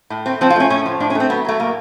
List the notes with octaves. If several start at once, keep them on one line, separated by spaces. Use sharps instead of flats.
A2
A3 C4
F3 C4
F4
A3 C#4
A2 C#4
F3
A2 D4
C#4
A3 C4
F#3 B3
F#3 A3
A2 A#3